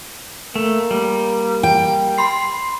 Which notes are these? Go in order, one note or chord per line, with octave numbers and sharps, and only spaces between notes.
A3 A#3
G3
G5
B5 C6 C7